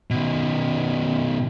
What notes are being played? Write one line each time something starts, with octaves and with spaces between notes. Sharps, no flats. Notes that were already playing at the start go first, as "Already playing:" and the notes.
B2 D#3